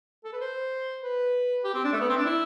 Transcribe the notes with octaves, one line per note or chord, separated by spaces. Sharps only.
A4
B4
C5
B4
G4
C4
D4
A3
B3
C4
D4
E4